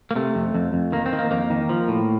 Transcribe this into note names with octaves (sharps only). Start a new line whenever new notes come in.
A#3
C3 A3
F2
F2
F2
D#3 A#3
C4
D#3
A#3
F2 A#3
D#3
F3
A2